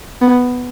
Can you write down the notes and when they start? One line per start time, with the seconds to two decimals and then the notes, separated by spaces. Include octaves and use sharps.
0.22 B3